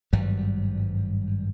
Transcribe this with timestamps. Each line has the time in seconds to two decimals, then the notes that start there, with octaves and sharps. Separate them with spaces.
0.13 G#1 G2 F#3 G3